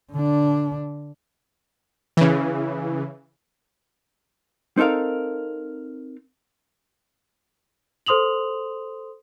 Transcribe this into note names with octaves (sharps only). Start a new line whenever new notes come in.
D3 D4
C#3 E3
C4 D#4 A4 A#4 F5
A4 C5 C6 D#6 F7 F#7